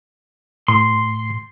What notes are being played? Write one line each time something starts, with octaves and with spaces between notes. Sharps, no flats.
A2 C6